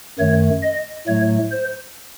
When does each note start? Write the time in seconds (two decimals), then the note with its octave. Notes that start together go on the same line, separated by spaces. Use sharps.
0.19 F#2 D#3 A3 C#5
0.63 D#5
1.07 A2 F#3 A3 C#5
1.51 C5